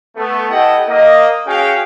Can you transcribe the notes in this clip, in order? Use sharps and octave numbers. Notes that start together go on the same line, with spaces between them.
A3 B3
E4 G4 A4 D#5 F#5 G5
A#3 D#5
C#4 F#4 G#4 F5 G5